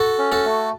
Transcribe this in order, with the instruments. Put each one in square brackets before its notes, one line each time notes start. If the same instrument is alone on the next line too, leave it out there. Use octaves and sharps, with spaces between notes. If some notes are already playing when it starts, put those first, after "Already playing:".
Already playing: [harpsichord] F#4 A4
[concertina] C#4
[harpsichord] F#4 A4
[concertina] A3